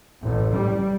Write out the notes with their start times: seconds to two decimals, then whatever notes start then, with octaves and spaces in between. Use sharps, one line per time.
0.22 A1
0.53 G3